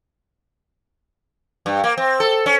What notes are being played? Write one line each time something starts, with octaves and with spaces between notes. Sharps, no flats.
G2
A#3
C4
A4
C#4